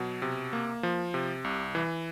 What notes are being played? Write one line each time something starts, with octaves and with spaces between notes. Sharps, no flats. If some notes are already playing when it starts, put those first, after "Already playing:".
Already playing: B2 F#3
C3
A#3
F3
C3
C2
E3